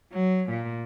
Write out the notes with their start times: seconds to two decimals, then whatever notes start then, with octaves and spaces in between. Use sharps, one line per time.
0.13 F#3
0.50 A#2